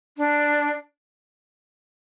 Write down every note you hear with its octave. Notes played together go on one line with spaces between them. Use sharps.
D4